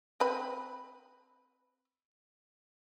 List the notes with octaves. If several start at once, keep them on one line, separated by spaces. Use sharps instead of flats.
C4 B4 B5